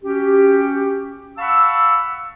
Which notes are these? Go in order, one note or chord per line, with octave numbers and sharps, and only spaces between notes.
C#4 F#4 G4
F5 F#5 A5 B5 C#6 E6